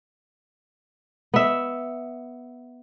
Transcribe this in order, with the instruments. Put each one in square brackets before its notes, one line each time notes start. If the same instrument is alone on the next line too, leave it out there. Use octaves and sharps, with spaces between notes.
[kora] B3 E5